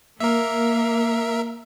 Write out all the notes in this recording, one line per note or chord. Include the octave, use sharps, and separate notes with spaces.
A#3 A#4 E5